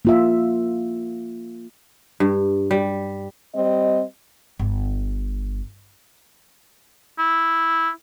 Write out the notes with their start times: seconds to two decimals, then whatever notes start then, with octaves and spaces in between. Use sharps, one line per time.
0.05 A#3 F4 E5
2.20 G2
2.71 G3
3.54 G3 C4 D#5
4.59 G1
7.19 E4